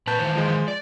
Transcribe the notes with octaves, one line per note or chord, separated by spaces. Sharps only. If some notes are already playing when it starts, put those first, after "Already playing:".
A#2 B4 A5 F#6 G6
D#3 E3 C5
F3 G#3
D5